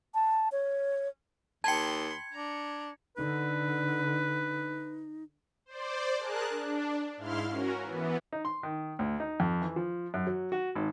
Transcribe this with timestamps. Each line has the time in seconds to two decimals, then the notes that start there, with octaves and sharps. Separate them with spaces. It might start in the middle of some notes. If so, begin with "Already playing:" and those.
0.14 A5
0.52 C#5
1.64 D#2 G5 A5 B5 C6 G#6 C#7
2.32 D4 A#5
3.17 D3 D#4 B4
5.66 C5 D5
6.18 G#4 A#4 A5 F#6
6.50 D4
7.17 G#2 E4 F5 C6 F6
7.49 C#4 F#4 A#4
7.83 E3 B3
8.32 D#4
8.45 C6
8.63 D#3
8.99 D2
9.20 D#4
9.40 F2
9.61 E3
9.76 F3
10.14 F#2
10.27 F#3
10.52 F#4
10.75 G#1